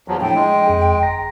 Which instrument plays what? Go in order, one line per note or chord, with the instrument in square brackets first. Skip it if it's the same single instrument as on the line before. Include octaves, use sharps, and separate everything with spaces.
[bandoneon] E2 F3 F#3
[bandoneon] A2 [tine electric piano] F3 D4 [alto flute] G5
[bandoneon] G#3
[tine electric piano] F2 G#4
G1 A#5 A#6